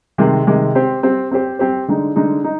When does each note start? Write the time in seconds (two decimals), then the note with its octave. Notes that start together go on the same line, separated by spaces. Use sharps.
0.18 C3 D#3 G#3
0.47 C3 D#3 G#3
0.75 C4 G4 C5
1.03 C4 G4 C5
1.31 C4 G4 C5
1.59 C4 G4 C5
1.88 D3 G#3 D#4
2.16 D3 G#3 D#4
2.44 D#4